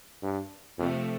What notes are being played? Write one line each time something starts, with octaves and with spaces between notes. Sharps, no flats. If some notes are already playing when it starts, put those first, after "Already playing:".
G2
F2 C3 F3 A3